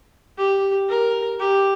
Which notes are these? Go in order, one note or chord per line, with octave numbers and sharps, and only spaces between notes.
G4
A#4
G4